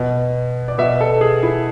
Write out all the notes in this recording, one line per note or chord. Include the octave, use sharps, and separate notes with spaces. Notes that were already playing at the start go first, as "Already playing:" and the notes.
Already playing: B2
D5
B2 E5
A4
G#4
E4